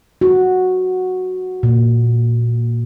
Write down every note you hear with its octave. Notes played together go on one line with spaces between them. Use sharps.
F#4
A#2